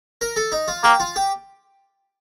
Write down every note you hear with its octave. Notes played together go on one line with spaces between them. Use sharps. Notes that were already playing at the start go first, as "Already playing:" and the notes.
A#4
A4
D#4
F4
A#3 G4
F4
G4